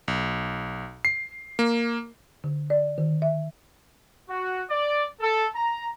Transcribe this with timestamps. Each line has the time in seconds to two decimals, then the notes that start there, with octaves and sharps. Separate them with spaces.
0.08 B1
1.05 C7
1.59 A#3
2.44 D3
2.70 D5
2.98 D#3
3.22 E5
4.29 F#4
4.70 D5
5.20 A4
5.55 A#5